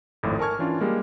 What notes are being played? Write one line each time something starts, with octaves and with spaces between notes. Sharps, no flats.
G#1 F2 A2
A#4 G#5 A5 C#6 F6 G#6
E3 C#4 D4 F4
G3 G#3 A#3